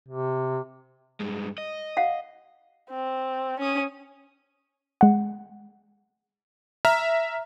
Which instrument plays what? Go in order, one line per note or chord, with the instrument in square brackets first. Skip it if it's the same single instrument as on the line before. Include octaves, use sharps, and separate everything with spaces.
[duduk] C3
[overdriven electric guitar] G2 G#3
D#5
[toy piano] F5 F#5
[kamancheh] C4
C#4 D#6
[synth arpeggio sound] G#3 F#5
[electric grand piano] E5 A#5 F6